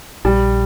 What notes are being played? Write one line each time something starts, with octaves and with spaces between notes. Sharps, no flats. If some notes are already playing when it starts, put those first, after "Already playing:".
A#1 G3